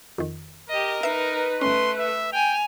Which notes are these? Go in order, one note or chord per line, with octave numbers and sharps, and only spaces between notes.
F2 D#3
G4 A#4 D#5
D#4 B4 E5 C7
G1 A3 C#4 C6
E5
G5 G#5 F7